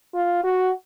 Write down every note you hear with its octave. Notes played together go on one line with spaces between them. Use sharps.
F4
F#4